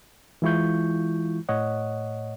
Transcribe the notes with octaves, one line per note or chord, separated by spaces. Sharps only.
E3 G#3 E4 F4 C#6 G6
A2 C#5 D#5 F#5